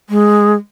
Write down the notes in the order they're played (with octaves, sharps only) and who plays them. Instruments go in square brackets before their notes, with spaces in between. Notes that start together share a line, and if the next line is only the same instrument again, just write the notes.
[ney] G#3